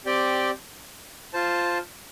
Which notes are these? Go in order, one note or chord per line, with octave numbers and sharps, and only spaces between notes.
C4 G4 D5 G5
F4 C5 A5